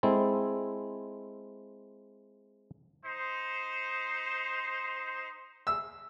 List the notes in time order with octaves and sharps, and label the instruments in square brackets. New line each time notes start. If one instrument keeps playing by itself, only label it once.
[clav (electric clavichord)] G#3 C4 E4 A4
[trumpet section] D#4 C5
[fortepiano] E6